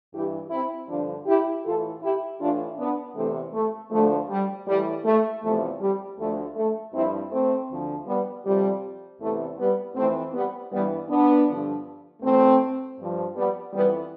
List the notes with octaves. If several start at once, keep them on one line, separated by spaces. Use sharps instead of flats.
G2 E3 E4 G4
C4 E4
G2 D3 F3 D4 F4
E4 G4
A2 E3 F4 A4
E4 G4
A2 E3 D4 F4
B3 D4
E2 C3 E3 A3 C4
A3
D2 D3 F3 A3
G3
A2 E3 G3
A3
E2 C3 F3 A3
G3
D2 D3 F3 A3
A3
G2 F3 C4 E4
A3 C4
D2 D3 F3
G3 B3
F2 C3 F3 G3
E2 C3 E3 A3
G3 B3
F2 E3 A3 C4
G3 B3
G2 E3 G3 B3
B3 D4
G2 D3 F3
E2 B2 A3 C4
G2 F3
G3 B3
F2 E3 G3 B3